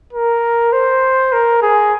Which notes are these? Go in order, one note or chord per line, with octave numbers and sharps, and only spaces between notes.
A#4
C5
A#4
G#4